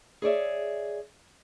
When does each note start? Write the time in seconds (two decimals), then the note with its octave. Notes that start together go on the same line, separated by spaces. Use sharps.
0.22 G#4 C#5 D5 E5